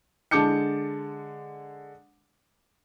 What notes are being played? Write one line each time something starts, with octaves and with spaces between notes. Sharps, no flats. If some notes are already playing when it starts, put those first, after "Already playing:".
D3 G#3 A5 D6 G6 C#7